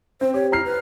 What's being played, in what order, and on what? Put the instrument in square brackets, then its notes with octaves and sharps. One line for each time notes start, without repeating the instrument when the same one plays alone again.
[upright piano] C4 [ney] C5
[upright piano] G4 [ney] C#5
[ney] E4 [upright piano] A#5 F6 C7
[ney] B4